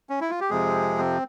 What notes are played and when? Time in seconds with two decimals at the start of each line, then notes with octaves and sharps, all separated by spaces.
0.10 C#4
0.21 E4
0.30 F4
0.40 G4
0.50 F2 C3 F3 G#3 G#4
0.98 C4